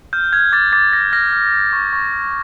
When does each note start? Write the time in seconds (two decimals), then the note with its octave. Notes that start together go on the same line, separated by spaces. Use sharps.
0.13 F6 G6
0.32 F6 G#6
0.52 D6 A6
0.73 D6 A6
0.93 F6 A#6
1.12 F6 A#6
1.33 F6
1.52 F6
1.73 C#6
1.93 C#6
2.13 F6